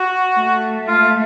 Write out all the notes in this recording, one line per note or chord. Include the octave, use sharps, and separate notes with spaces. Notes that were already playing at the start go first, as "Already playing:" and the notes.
Already playing: F#4
A3
F4